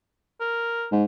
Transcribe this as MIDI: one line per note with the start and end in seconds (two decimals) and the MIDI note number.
0.40 0.87 70
0.92 1.04 44